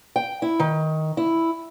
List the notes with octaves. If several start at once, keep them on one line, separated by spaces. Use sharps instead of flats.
G5
E4
D#3
E4